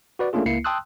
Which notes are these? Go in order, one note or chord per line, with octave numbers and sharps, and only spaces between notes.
F#4 B4 D5
A3 A#3 C#4 D4 F4 G#4
C#2 A#3 E4 C7 C#7
G5 A5 C6 D#6 E6 F#6